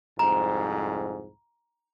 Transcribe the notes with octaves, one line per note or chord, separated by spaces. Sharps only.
C2 F2 G#2 A#5